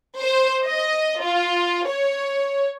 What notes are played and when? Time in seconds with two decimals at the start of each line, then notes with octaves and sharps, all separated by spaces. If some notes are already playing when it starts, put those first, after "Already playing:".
0.20 C5
0.65 D#5
1.22 F4
1.88 C#5